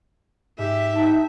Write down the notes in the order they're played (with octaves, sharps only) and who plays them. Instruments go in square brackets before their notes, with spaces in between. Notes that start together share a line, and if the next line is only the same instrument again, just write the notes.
[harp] G#2 [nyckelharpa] G4 [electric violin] E5
[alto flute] D#4 [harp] G5 A5